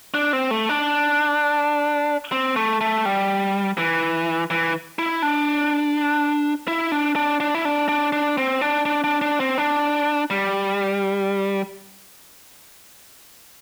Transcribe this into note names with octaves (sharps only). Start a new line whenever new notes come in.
D4
C4
A3
D4
C4
A3
A3
G3
E3
E3
E4
D4
E4
D4
D4
D4
E4
D4
D4
D4
C4
D4
D4
D4
D4
C4
D4
G3